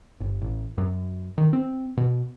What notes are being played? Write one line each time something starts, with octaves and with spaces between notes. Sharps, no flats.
G1
A1
F#2
D#3
C4
B2